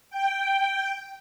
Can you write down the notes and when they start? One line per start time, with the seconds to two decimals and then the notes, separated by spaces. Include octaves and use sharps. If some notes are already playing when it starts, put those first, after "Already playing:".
0.10 G5